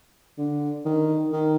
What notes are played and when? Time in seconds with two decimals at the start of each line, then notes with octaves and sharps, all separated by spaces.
0.38 D3
0.85 D#3
1.33 D#3